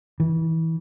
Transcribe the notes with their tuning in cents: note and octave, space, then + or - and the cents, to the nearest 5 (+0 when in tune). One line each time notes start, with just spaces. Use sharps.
E3 -25